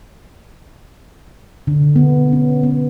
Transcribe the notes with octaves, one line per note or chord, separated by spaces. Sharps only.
D3
B3
C#4
B3